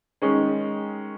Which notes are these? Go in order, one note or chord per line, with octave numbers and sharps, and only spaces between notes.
D#3 G#3 C#4